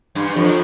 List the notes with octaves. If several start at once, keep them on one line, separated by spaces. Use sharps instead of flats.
G2
F2